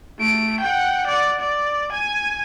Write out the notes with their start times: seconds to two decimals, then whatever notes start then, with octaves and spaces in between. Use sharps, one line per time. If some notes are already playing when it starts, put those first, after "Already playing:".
0.19 A3 D7
0.61 F#5 G5
1.07 D5 F#5
1.40 D5
1.92 G#5